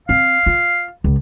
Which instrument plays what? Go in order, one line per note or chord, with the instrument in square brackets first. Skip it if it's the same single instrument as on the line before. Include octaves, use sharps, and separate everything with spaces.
[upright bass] C4 [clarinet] F5
[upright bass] F4
C#2